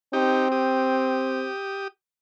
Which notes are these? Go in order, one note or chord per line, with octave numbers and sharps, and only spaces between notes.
C4 D#4 G4
G4 D#6